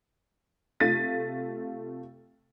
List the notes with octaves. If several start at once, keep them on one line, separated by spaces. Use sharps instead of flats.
C3 A3 F4 A6 B6 D#7